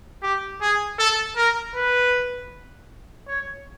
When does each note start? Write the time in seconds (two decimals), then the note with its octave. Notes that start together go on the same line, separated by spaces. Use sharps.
0.22 G4
0.61 G#4
0.99 A4
1.37 A#4
1.76 B4
3.28 C#5